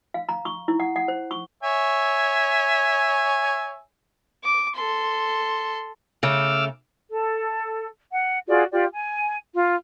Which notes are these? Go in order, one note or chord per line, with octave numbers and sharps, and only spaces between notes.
F5
A#5
C#6
E4
F#5
F#5
C5
C#6
C#5 E5 G#5
D6
A4 C6
C#3 A3 D6 E6 F6
A4
F#5
F4 F#4 G#4 D5
F4 G4 D5
G#5
F4